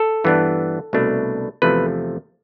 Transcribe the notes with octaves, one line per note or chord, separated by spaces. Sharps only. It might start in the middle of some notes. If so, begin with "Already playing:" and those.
Already playing: A4
G2 E3 B3 D4
C2 B2 A3 D4
E2 C3 F3 A3 B4